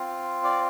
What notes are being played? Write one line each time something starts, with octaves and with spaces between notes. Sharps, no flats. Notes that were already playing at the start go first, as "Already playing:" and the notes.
Already playing: C4 F4
D5